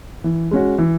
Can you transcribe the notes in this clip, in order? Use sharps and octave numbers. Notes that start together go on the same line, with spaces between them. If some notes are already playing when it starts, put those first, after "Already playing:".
E3
G#3 C#4 F#4
E3